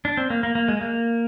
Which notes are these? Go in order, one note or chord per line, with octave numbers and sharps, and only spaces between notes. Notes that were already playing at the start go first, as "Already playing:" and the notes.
D4
C4
A#3
A#3
A#3
G#3
A#3